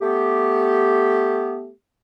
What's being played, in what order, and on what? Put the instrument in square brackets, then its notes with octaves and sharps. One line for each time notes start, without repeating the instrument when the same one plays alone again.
[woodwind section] A3 B3 G4